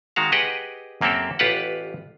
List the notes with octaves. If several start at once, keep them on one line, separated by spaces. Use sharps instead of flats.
D#3 G#3 F#4 F5
G4 G#4 B4 D#5 F#5 G5
F#2 A#3 C4 G4 A4 A#4
A1 F4 G4 B4 F#5